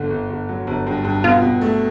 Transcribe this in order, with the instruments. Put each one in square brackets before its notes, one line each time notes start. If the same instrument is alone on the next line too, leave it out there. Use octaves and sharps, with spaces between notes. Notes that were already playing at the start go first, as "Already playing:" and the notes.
Already playing: [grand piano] G1 D3
G1
G1
F#3
G1
G2
G2
[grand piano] B2 [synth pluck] F4
[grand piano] B2
A3